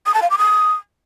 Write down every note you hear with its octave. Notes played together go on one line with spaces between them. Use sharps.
D#6
A5
F5
D6
D#6